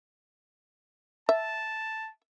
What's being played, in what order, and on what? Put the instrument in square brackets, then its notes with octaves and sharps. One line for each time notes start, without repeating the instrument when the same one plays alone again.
[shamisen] E5 [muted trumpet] A5